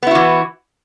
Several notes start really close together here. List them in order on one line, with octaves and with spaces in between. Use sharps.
B3 E4 F#4 E3